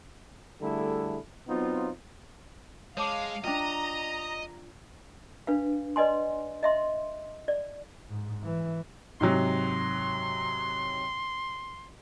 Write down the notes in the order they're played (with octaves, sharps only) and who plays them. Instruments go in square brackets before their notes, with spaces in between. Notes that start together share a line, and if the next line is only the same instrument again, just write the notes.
[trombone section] D3 G3 A3 E4 G#4 A4
F#3 B3 C4 D#4 F4
[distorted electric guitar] G#3 [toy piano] C#5 A5 D6 [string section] F5
[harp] D4 F4 [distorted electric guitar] D#5 [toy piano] E5 G5 [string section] A#5
[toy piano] D4 B4 F5
B4 D5 D#5 G#5 C6
D#5 E5 C6
D5
[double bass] G#2
E3
[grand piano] G#2 C3 F#3 [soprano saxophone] C6